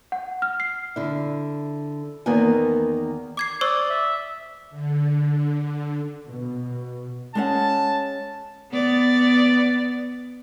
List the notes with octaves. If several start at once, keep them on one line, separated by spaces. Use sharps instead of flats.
F#5
F6
C7
D3 E4
E2 D#3 A#3 B3 G#5
D6 G#6 C7
C5 D5 C#6 D#6 E6
E5
D3
B2
G#3 C#4 F#5 A5
B3 D5